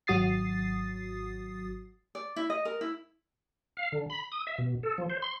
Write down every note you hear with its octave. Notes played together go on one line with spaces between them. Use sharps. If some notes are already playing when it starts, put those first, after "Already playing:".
G#1 F#3 F#4 D#6 A6 C7
D5
E4
D#5
A#4
E4
F5
D3
B5
D#6
E5
B2
A4
F3
C5
C6